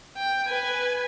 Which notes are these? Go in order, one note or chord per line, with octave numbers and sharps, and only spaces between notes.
G5
B4 G#5